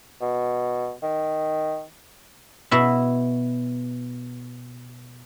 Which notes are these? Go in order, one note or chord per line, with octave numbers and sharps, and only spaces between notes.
B2
D#3
B2 E4 E5